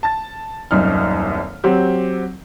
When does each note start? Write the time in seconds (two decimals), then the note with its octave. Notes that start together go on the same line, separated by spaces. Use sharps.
0.03 A5 A6
0.71 D#1 C2 F#2 D#4 F6
1.64 F#3 C4 G4